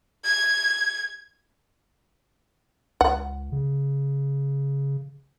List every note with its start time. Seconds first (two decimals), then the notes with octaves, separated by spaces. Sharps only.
0.24 G#6
3.01 C#2 F#5
3.52 C#3